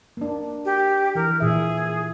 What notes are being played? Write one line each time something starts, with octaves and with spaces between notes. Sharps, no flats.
A#3 D4
G4
E3 A#4
A#2 E3 G#4 E5